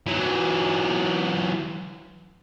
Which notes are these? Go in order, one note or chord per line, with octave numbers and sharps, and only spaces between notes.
E3 F#3